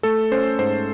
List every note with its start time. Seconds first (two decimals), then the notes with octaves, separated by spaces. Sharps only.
0.03 A3 A4
0.32 C#4 C5
0.59 G#2 C5